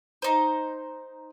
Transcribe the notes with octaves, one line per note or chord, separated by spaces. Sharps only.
D#4 C5